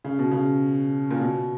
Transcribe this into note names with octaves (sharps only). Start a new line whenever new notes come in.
C#3
B2
C#3
A#2
B2